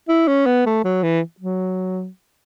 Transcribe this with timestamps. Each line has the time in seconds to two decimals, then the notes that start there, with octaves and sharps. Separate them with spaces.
0.09 E4
0.28 C#4
0.46 B3
0.66 A3
0.84 F#3
1.03 E3
1.40 F#3